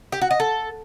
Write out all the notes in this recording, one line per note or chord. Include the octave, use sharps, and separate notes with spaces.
G4
F#4
D#5
A4